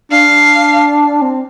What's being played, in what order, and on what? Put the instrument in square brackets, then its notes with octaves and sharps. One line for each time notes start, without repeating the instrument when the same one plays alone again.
[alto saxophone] D4 [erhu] F5
[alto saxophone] C4